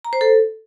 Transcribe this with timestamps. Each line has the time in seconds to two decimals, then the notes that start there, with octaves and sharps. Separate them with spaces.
0.05 A#5
0.13 C5
0.21 A4